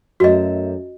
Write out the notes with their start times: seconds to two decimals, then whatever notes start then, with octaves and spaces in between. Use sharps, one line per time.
0.20 F#2 A3 F#4 D#5